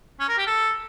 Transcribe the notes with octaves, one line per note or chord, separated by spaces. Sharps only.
C#4
A#4
G4
A4